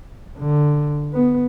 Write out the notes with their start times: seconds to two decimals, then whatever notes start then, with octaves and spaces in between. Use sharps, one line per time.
0.39 D3
1.13 B3